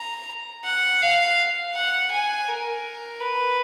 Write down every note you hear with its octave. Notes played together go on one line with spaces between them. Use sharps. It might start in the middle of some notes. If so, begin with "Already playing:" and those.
Already playing: A#5
F#5
F5
F#5
G#5
A#4
B4